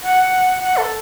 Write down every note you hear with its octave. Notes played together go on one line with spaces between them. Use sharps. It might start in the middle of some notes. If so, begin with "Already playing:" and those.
F#5
F#5
A4